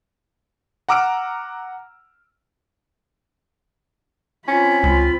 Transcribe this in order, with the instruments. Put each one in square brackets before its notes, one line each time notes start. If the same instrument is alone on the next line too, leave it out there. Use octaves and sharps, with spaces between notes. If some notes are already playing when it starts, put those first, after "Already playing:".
[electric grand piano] F#5 A#5 D6 E6 F6 D7
[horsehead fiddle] C4 B5 [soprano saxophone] C#4 [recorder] F4
[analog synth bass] C#2 [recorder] F4